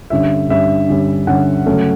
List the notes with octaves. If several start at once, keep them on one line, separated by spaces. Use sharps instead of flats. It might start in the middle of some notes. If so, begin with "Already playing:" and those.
G2 D3 G3 C#4 E5
G2 D3 G3 C#4 E5
G2 D3 G3 C#4
G2 D3 G3 C#4 F#5
C#3 F#3 A3 C#4